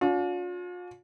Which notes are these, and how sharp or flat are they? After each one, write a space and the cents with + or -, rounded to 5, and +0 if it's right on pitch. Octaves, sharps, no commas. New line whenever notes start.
D4 -45 F4 +40